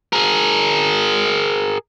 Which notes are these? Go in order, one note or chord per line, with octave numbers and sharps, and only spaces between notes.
G#4 A#4